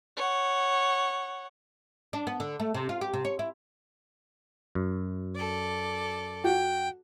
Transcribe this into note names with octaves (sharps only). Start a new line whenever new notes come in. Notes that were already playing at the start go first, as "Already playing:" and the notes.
C#5 F#5
D4
B3
D3
A3
C3
F4
G4
C3
C#5
E4
F#2
A4 D5
F#4 G5